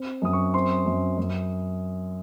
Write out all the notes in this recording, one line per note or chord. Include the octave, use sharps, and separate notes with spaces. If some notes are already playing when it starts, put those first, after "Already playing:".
Already playing: C4
F#2 D#6
C#6
C4 C6
F#2
F#2